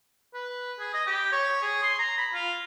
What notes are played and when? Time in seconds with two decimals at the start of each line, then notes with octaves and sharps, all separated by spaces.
0.34 B4
0.80 G#4
0.94 D#5
1.07 G4
1.32 C#5
1.62 G#4
1.83 C6
1.99 A#5
2.18 B5
2.34 F4